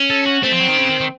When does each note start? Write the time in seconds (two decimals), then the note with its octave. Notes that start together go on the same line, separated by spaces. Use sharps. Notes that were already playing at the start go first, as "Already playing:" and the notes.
Already playing: C#4
0.10 A4
0.26 F#4
0.43 A3 C4
0.52 F3
0.60 F#3
0.68 D#3
0.77 C#3
0.89 D#3
1.00 D#3